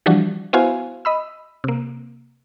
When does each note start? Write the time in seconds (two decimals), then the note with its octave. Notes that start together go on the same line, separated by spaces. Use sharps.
0.06 E3 F3 G3 D4 F#4
0.53 B3 E4 F#4 C5 F5 G#5
1.05 D#5 B5 E6
1.64 C3 A#3